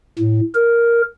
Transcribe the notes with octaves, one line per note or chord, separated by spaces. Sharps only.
A2
A#4